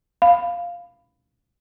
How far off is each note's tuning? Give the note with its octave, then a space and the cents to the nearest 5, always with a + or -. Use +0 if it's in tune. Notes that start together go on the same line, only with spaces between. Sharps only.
F5 +0 B5 +10